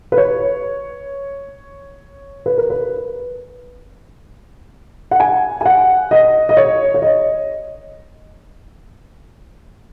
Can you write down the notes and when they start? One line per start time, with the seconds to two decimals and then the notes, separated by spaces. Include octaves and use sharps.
0.12 B4
0.17 C#5
2.46 B4
2.58 A#4
2.70 B4
5.11 F#5
5.20 G#5
5.61 G#5
5.66 F#5
6.11 D#5
6.49 D#5
6.57 C#5
6.94 C#5
7.02 D#5